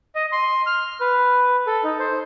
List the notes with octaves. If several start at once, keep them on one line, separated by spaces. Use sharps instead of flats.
D#5
C6
F6
B4
A4
D#4
C5